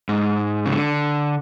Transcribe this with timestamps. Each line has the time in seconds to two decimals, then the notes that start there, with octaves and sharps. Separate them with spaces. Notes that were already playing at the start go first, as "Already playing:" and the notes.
0.09 G#2
0.66 C#3
0.72 D3